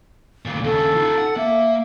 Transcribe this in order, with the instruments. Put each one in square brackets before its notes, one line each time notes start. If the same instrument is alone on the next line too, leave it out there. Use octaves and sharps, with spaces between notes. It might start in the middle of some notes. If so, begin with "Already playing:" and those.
[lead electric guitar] D2 A#2
[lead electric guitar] D#2 C#3 [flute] A4
[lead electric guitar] D#4 F4
F#5
[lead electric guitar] A#3 [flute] E5